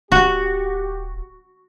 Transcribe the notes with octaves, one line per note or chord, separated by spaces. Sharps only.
D1 F#4 G4